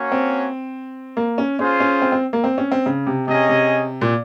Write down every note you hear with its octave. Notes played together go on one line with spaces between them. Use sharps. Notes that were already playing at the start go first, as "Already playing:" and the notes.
Already playing: A#3 C#4 F#4 C#5
C4
A#3
C#4
C#4 F4 G#4 C5
C#4
C4
C4
A#3
C4
C#4
C4
C#3
C3
C3 C#4 G#4 D#5
C3
A#2